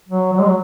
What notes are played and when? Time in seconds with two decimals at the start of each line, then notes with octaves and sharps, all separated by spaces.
0.09 F#3
0.33 F#3
0.39 G#3
0.46 F#3